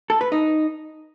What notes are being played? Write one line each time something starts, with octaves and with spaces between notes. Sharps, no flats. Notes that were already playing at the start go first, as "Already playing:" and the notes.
A4
B4
D#4